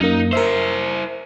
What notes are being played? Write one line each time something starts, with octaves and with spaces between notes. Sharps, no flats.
F#2 A#3 D#4
E4 A#4 C5 E5